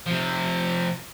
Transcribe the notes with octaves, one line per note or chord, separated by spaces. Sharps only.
C3 F3